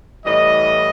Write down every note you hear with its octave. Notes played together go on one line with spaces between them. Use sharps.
A2 E3 G3 D#5